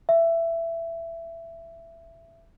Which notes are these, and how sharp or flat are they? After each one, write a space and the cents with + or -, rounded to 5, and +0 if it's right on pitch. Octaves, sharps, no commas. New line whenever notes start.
E5 +15